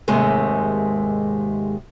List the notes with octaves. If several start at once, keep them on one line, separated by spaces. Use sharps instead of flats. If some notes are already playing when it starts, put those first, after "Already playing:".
D#2 G#2 C3 G#3 A3